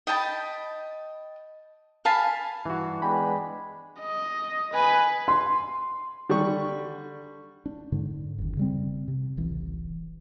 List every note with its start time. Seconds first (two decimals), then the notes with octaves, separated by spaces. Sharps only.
0.07 D#5 G5 A5 B5
2.05 F5 G#5 A5 B5
2.66 G2 E3 F#4
3.02 G#3 B3 D4 G5 G#5 B5
4.00 D#5
4.73 B4 G#5
5.28 C6
6.29 D3 G3 D4 C#6
7.66 D4
7.92 G#2 D3
8.38 F#1 D#2
8.57 C#3 G3 C4
9.08 C3
9.37 D1 A1 E3